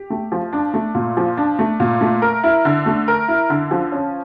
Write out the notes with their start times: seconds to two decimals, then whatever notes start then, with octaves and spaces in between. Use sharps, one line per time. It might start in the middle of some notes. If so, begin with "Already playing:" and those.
Already playing: G4
0.10 A3
0.32 F3
0.53 D4
0.74 A3
0.95 A#2
1.17 F3
1.37 D4
1.59 A3
1.80 A#2
2.01 A3
2.22 A#4
2.44 E4
2.65 D3
2.86 A3
3.08 A#4
3.28 E4
3.50 D3
3.71 F3
3.92 C#4